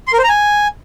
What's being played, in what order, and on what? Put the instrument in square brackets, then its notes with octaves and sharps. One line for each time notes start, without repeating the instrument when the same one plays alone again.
[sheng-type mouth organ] C6
A#4
C5
A#5
G#5